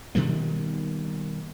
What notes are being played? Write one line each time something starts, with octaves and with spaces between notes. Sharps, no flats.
B2 D#3 G3 A#3